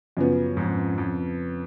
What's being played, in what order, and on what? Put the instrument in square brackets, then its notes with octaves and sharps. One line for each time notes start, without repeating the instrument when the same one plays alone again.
[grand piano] F#2 [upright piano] C#3 F3 B3
[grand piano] F2 G#2
F2